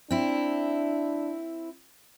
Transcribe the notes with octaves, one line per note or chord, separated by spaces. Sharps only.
C4 D4 E4